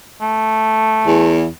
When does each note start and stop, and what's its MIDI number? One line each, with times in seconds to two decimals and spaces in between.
0.22 1.37 57
1.05 1.46 40